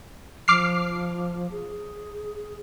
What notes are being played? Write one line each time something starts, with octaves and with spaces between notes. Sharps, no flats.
F3 D6 F6 C7
G#4